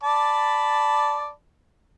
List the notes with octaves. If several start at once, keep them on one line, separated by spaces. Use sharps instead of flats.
D5 A5 B5